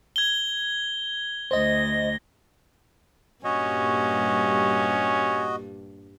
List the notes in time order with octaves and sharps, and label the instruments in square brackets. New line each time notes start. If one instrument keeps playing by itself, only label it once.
[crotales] G#6 G7
[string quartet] D2 A#6 [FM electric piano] C5 D#5
[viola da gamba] G2 A#2 G3 [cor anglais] C#4 [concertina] F#4 D#5